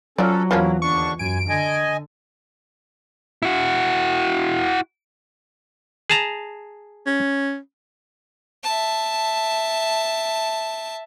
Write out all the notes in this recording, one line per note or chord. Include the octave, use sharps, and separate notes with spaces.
F3 F#3 C#4 F4 A4 D5
E2 F3 A#3 C#4 E4
D#2 D3 D4 C#6
F#2 G#5 D7
D3 D#5 G#5
E4 F#4
G#4 A5 A#5
C#4
E5 A5